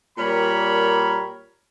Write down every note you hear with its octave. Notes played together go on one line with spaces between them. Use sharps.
A#2 G3 A#4 C#5 A#5 B5